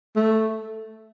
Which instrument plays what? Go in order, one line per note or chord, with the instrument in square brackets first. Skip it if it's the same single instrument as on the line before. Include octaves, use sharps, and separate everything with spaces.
[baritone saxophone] A3